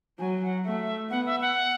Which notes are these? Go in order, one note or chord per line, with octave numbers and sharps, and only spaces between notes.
F#3 G#5
F#5
A3 E5
B3 F#5
E5
F#5